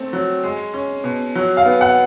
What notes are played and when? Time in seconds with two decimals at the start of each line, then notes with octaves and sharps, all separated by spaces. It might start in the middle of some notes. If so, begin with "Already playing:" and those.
Already playing: A3 C4
0.13 F#3
0.43 G#3
0.74 C#4
1.04 B2
1.35 F#3
1.57 F5
1.65 B3
1.81 F#5